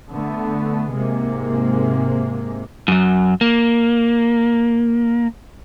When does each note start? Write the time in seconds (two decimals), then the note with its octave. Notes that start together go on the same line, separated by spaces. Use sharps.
0.10 D3 A3 B3
0.92 G#2 C3 G#3 A#3
2.88 F#2 F#3
3.41 A#3